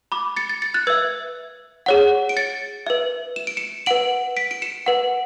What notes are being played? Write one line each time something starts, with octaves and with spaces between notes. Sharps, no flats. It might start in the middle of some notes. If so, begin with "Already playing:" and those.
B5 D6
A6 C#7
A6 C#7
A6 C#7
F#6 A6
B4 E5 E6 G#6
G#4 C#5 F#5
D7
A6 C#7
B4 E5
E7
D7
C#7 E7
B4 F#5 D7 F#7
B6 D7
D7
C#7 E7
B4 F#5